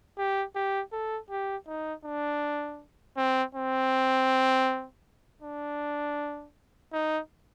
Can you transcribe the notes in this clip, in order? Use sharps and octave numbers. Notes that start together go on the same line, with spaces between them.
G4
G4
A4
G4
D#4
D4
C4
C4
D4
D#4